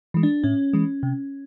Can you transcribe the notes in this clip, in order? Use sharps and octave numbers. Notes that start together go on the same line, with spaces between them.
E3 G#3
D4
A2 C#4
E3 G#3
C3